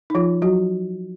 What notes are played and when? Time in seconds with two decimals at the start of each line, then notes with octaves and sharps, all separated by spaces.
0.10 D#4
0.15 F3 F4
0.42 F#3 F#4